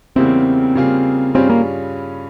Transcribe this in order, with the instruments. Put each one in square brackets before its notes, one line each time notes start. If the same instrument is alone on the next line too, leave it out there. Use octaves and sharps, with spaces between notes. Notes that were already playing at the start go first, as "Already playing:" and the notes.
[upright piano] E2 C#3 G3 A#3 E4 [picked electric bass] C4
[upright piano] C#3 G3 A#3 F4 G#4
[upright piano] G2 G3 C#4 F4 G#4 [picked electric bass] C4
[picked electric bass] A#3